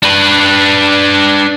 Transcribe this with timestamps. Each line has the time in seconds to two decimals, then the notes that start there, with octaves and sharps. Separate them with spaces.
0.03 D4 B4